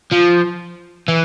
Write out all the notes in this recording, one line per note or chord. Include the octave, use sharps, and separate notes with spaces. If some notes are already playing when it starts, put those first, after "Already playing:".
F3
E3